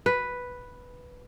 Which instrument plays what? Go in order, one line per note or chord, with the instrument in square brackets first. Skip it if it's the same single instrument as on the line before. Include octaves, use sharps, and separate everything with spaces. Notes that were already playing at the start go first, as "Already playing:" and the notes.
[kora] B4